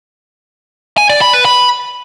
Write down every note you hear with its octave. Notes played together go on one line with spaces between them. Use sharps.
G#5
D5
B5
B4
B5